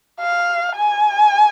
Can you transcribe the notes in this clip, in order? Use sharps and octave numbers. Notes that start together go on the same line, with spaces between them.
F5
G#5